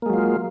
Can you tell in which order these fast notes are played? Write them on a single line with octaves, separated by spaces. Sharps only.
A#3 G#3 F#3 F4